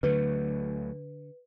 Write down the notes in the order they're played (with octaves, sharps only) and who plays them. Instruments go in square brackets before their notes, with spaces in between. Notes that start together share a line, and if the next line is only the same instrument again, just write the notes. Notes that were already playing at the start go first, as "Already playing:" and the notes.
[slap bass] D2 F#3 A3 [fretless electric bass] D3 [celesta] B4